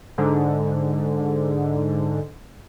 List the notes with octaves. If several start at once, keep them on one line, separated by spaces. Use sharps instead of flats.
G#2 D3